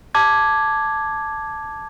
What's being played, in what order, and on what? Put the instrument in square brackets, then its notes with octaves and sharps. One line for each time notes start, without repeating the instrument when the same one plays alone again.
[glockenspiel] A5 D6 G#6